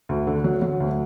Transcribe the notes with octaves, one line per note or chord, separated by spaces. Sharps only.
D2
D3
F#3
F#3
D2